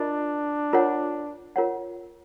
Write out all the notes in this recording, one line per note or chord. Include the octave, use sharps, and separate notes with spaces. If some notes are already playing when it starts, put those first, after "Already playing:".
Already playing: D4 F4 A#4 D#5
F4 A#4 C#5 F#5
F4 A#4 C#5 F#5